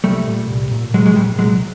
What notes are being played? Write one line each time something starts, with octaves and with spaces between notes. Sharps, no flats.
C2 G3 A3
A#2
C2
A#2
C2 F#3 G#3
F#3 G#3
A#2 G3
C2 F#3 G#3